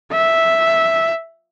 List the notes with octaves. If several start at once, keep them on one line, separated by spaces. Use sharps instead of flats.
E5